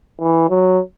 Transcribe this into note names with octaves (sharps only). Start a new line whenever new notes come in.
E3
F#3